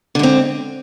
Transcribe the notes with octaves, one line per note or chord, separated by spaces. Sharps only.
G#2 D3 C4